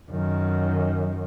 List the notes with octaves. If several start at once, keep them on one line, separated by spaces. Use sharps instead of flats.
F#2 D#3